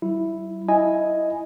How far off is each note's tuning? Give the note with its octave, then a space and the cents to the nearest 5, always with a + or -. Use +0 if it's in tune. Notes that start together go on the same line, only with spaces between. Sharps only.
F#3 +45 E4 +0
E4 +0 D#5 +0 G#5 +0